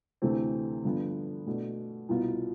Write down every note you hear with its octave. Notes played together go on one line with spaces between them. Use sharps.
D2 C3 E3 A3 C4
G2 D3 F3 B3
B2 A3 D4
C2 B2 B3 F4